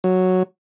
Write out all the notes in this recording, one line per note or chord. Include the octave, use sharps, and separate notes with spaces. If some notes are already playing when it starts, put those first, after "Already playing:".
F#3